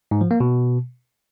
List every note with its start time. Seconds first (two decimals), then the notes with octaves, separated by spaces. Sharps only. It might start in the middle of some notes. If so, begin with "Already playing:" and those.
0.11 G#2
0.21 F3
0.31 A#3
0.40 B2